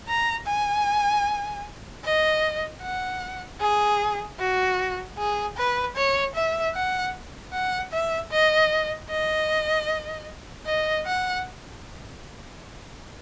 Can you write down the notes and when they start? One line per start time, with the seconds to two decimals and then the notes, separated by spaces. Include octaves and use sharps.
0.08 A#5
0.47 G#5
2.04 D#5
2.82 F#5
3.61 G#4
4.39 F#4
5.18 G#4
5.57 B4
5.96 C#5
6.35 E5
6.75 F#5
7.53 F#5
7.92 E5
8.31 D#5
9.10 D#5
10.66 D#5
11.06 F#5